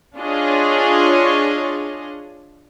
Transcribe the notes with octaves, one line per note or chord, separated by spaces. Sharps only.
D4 F4 G#4 C#5 D#5